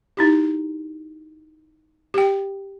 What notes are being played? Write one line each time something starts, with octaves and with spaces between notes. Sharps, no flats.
D#4 E4 G4
G4 G5